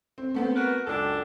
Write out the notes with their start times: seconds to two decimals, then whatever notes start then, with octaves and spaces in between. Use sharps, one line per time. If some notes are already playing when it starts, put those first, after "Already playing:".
0.18 C4
0.34 A3 B3 C4
0.56 F#4 A#4 B4
0.87 C#2 F#2 D4 A4